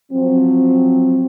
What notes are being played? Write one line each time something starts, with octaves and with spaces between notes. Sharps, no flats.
F3 F#3 C4